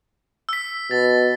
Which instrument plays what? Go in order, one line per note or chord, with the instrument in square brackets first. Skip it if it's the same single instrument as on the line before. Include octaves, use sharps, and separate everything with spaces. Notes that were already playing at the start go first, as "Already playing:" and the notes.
[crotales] E6 B6
[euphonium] B2 [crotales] A6